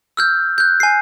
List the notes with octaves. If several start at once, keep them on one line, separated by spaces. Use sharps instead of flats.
E6 F6 G6
F#6 G6
G#5 C7